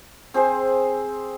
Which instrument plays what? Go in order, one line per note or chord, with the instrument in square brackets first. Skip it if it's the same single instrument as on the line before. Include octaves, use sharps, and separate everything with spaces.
[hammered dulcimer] C4 G#4 C5 G#5